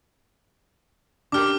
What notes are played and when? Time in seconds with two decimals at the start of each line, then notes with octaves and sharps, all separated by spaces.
1.32 D4 G4 A#4 D6 F6